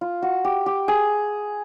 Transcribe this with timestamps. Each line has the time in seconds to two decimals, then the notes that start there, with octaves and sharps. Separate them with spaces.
0.01 F4
0.22 F#4
0.44 G4
0.66 G4
0.88 G#4